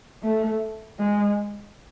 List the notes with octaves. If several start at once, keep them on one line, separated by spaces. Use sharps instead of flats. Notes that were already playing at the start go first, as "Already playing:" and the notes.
A3
G#3